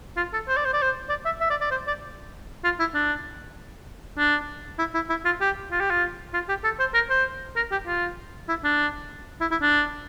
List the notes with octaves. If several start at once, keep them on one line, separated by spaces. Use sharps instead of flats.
F4
A4
C5
D5
C5
D5
C5
D5
E5
E5
D5
D5
C5
D5
F4
E4
D4
D4
E4
E4
E4
F4
G4
F4
G4
F4
F4
G4
A4
C5
A#4
C5
A#4
G4
F4
E4
D4
E4
E4
D4